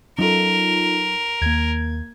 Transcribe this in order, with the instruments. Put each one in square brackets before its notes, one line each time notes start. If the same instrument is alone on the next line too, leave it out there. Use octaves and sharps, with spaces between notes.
[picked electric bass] F#3 C#4 [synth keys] D#4 F4 A4 [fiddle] A#4
[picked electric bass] D#2 [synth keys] A#3 G#6